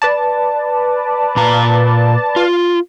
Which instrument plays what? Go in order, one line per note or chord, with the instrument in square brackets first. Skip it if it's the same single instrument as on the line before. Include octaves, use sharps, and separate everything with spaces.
[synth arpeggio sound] B4 D5 A5
[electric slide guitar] A#2 A#5
F4